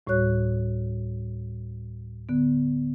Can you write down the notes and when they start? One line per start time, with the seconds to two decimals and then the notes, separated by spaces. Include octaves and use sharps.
0.07 D2 A2 G3 F#4 C#5 F#6
2.29 D3 B3